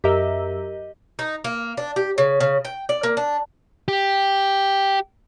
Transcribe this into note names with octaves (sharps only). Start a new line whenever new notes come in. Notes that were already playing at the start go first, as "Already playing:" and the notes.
F#2 G4 A#4 D#5 E5
D#4
A#3
D4
G4
C#3
C#3
G5
D5
A#3
D4
G4